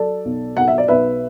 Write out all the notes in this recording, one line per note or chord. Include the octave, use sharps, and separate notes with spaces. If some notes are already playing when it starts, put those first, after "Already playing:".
Already playing: F#3 A4 D5
B1
B1 F#5
E5
D5
B1 B4 E5